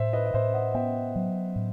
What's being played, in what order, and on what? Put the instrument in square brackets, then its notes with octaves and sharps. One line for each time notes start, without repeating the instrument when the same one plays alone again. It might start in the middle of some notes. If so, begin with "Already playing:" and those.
Already playing: [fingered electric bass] A2 [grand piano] C5 E5
[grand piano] B4 D#5
D#5
[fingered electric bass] A2 [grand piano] C5 E5
[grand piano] D#5 F#5
[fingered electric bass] B3 [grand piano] E5 G5
[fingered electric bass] F#3
A2